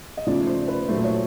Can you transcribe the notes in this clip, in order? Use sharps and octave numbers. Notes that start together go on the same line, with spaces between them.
D#5
C#3 F3 A3 D5
C5
B4
A#2 F#3 A3 C5
C#5